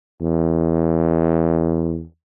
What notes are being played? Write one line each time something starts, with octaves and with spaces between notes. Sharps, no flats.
E2